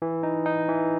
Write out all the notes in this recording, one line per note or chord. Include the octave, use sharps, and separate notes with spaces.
E3
D#4
D#4
E3